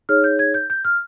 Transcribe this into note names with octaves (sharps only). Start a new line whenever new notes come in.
D#4 G#4 C#5 F6
G6
G#6
G6
G6
F6